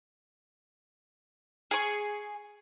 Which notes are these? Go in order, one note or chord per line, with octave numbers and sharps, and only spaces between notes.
G#4 C#6